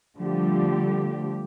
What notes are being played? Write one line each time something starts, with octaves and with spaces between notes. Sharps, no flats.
D3 F3 G3 A3 G4